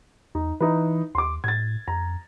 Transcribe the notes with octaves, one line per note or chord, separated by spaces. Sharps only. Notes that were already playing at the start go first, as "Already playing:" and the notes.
E2 D#4
E3 D#4 E4 B4
D#2 C6 D6
A2 G#6 A6
F2 A#5